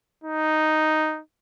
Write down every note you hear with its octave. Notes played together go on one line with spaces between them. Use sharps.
D#4